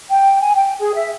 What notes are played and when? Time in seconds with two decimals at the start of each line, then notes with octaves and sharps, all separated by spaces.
0.10 G5
0.41 G#5
0.55 G5
0.80 G#4
0.95 E5